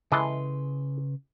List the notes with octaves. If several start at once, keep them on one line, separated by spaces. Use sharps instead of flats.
C#3 E3 G#3 A4 B4 C6